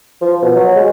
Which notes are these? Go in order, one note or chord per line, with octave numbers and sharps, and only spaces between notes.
F3
B2
F#3
G#3